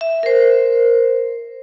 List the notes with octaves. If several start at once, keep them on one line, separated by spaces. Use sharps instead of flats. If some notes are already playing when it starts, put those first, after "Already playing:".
E5
A#4 C5